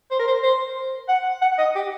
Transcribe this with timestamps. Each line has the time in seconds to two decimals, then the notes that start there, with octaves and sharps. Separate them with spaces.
0.11 C5
0.19 A#4
0.27 C5
0.43 C5
1.08 F#5
1.41 F#5
1.58 D#5
1.75 G4